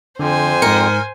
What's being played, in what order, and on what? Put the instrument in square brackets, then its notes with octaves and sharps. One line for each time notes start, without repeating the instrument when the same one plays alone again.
[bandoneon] F2 [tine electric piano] D3 [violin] C5 G#5
[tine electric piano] G#2 C#7 [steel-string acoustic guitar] A#4